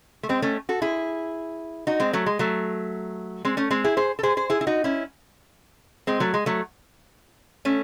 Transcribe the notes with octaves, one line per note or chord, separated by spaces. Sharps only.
A3
G#3 C4
A3 C#4
F#4 A4
E4 G#4
D#4 F#4
G#3 C4
F#3 A3
G#3
F#3 A3
G#3 C4
A3 C#4
G#3 C4
E4 G#4
G#4 C5
A4
G#4 C5
G#4 C5
E4 G#4
E4
D#4 F#4
C#4 E4
G#3 C4
F#3 A3
G#3
F#3 A3
A3 C#4